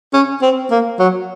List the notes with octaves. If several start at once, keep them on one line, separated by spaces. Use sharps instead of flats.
C#4
C4
A#3
F#3